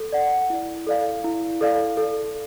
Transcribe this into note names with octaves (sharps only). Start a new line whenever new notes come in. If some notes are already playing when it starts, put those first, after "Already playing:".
Already playing: A4
D5 F#5
E4
A4 D5 F5
E4
A4 D5 F5
A4